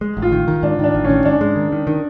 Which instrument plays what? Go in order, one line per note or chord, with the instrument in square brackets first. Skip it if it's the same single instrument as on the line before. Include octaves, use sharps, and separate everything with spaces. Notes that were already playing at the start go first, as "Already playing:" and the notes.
[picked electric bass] G#3
A1
[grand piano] F4
[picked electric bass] D#3
D#3
[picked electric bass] G#2 [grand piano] D4
[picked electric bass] D#3 [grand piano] D4
[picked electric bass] A1
[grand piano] C#4
[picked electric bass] D#3
[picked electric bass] G#2 [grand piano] D4
[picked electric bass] G#3
D#3
D#3
D#3